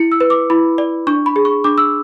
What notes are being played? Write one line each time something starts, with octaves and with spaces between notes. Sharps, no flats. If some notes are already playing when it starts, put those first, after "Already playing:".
Already playing: E4 C#7
E6
B4
D6
E4 B5
D5
D4 C#6
B5
G#4
C#6
D4 D6
E6